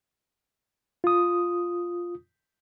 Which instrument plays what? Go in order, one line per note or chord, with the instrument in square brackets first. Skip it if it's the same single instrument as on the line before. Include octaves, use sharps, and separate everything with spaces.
[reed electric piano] F4 D#6